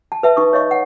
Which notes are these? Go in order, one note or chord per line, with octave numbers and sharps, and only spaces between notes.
A5
B4 E5 A5
D#4 C#6 D#6
C#5 D#5 F5 C#6
F#5